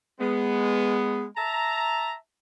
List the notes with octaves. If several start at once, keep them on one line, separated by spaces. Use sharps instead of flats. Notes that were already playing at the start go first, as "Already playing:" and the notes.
G#3 B3
E5 A5 A#5